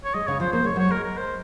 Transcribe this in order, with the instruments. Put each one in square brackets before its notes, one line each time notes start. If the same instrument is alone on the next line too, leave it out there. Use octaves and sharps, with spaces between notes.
[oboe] C#5
[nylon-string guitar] G#3 [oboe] D#5
[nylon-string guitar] C#3 [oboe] C#5
[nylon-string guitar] F3 [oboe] C5
[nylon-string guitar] A#3 [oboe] C5
[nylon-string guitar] G#3 [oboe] C#5
[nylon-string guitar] F#3 [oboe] C#5
[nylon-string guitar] G#3 [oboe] A#4
[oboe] A#4
C5